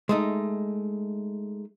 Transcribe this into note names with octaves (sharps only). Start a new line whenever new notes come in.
G#3 A3 D#4